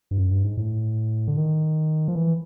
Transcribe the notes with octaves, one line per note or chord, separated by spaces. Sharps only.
G2
F#2
G2
G#2
A2
D3
D#3
F3
E3